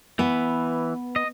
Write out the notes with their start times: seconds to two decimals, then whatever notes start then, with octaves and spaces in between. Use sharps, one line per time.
0.19 E3 B3
1.16 D#5